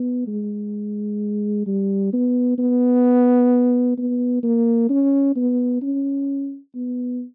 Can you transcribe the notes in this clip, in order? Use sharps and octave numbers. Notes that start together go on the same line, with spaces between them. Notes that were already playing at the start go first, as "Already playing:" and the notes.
Already playing: B3
G#3
G3
B3
B3
B3
A#3
C#4
B3
C#4
B3